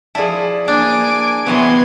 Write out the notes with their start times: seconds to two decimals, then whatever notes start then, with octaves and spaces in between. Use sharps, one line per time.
0.15 F3 E4 G#4 D5 A5
0.68 A#3 D4 G#5 D6
1.46 C3 E3 F#3 B3 C6 G#6